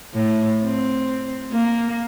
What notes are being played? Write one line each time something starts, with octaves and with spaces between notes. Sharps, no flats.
A2
C4
A#3